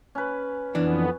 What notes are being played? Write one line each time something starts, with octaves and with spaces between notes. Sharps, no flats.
C#4 B4
F2 E3 B3 D4